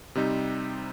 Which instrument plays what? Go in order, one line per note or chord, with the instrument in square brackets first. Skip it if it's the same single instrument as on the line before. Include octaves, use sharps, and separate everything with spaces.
[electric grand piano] C3 G3 C4 D#4